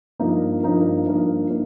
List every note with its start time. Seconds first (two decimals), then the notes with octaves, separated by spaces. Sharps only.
0.19 G2 F3 A#3 D#4 A#4
0.63 G2 F3 A#3 D#4 A#4
1.07 G2 F3 A#3 D#4 A#4
1.50 A#3 D#4 A#4